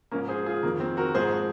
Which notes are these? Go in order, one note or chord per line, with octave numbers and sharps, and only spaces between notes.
G#2 F3 A#3 C#4
G#4 C5
F4 G#4
F2 D#3 A#3
C4
F#4 A#4
G#2 F3 G#4 C5